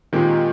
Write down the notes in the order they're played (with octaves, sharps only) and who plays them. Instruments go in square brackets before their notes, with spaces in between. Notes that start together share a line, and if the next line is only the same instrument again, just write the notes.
[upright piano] A#2 [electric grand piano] D#3 G#3 C4 G4